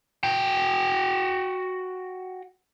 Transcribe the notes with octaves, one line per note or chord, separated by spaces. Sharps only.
F#4 G5